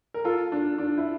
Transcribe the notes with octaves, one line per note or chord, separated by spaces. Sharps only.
A#4
F4 A4
D4
D4
E4